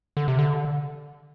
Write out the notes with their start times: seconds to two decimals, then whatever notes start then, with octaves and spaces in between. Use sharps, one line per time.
0.17 D3
0.28 C3
0.39 D3